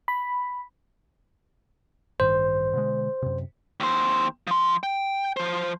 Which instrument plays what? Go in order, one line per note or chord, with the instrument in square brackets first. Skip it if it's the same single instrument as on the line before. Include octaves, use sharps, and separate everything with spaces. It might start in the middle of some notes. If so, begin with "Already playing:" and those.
[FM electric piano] B5
[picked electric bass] A1 G2 D#3 [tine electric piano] C5
[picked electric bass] B2 D3 G#3
F#2 C3
[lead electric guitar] D#2 C5
F3 C6
G5
F3 C5